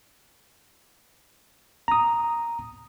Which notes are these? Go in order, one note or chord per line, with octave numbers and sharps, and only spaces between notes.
A#5 D#6